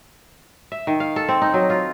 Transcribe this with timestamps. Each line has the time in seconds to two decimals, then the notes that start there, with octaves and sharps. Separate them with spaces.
0.72 E5
0.87 D#3
1.00 F5
1.16 A4
1.29 C4
1.42 D#4
1.54 F#3
1.70 F4